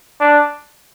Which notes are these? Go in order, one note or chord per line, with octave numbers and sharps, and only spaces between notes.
D4